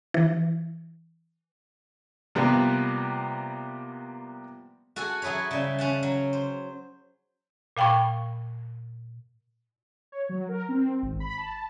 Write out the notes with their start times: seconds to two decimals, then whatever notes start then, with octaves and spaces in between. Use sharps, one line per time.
0.14 E3
2.35 C3 F3 G3 A#3 B3
4.96 F#4 A4 F#5 G#5
5.22 F#3 E4 G#4 B4 C#5
5.51 C#3 G3 E5
5.78 C#4 F#5 A5
6.03 F#3
6.33 C5
7.77 A#2 F5 G5 B5 C#6
10.12 C#5
10.29 F#3
10.49 A#4
10.69 C4
11.02 G#1
11.20 B5
11.38 A5